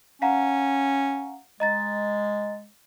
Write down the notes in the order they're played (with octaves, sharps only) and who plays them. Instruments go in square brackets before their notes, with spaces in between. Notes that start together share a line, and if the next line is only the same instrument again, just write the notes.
[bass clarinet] C#4 [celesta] F5 F#5 A#5
[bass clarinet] G#3 [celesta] D#5 A#5 A6